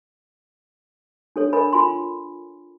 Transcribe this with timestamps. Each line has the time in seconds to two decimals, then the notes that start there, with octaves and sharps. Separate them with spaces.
1.36 D4 A4 C#5
1.53 A#4 C#5 D#5 G#5 B5
1.73 F4 G#5 B5 C6